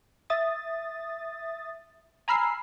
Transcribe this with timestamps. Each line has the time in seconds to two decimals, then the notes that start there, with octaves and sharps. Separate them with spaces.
0.30 E5 D#6 A6
2.28 G#5 A#5 B5 E6 F6 C7